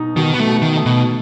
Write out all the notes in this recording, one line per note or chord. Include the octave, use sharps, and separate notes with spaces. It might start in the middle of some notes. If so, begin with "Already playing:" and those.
Already playing: B2 D#4
B2 D#3
B3
A3
B2
D#3
A3
B2